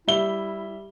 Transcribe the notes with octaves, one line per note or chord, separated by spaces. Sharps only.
G3 E4 E5 G7